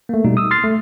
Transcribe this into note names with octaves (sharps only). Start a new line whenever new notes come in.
A3 A#3
B2 G3 D#4
D#6 E6
C6 F6 A6 C7
A3